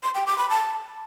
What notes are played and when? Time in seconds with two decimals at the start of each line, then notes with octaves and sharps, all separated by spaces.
0.03 C6
0.15 G5
0.26 D6
0.38 B5
0.50 A5